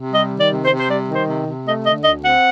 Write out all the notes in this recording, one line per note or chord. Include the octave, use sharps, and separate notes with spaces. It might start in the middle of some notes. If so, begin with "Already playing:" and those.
Already playing: C3
G3 D#5
D#3
D5
C3
C5
C3
C5
G3 D5
D#3
C5
C3
C3
A3 D#5
D3 D#5
D2 D#5
C4 F#5